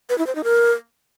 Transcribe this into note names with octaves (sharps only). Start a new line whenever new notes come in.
B4
E4
C5
D#4
A#4